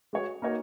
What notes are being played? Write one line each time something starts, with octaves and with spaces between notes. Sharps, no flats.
G#3 F#4 C#5
A#3 D#4 F#4 A#4 C#5